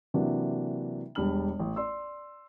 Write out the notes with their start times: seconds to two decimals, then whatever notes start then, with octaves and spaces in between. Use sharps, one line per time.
0.14 C3 E3 F#3 A#3 D4 F#4
1.15 E1 G3 D4 B5 F6 F#7
1.59 A1
1.76 D5 C6 E6